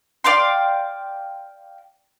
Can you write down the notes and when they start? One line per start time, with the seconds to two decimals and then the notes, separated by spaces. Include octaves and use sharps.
0.24 D5 F5 G5 C6